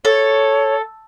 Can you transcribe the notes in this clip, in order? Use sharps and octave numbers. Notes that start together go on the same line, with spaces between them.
A4 C#5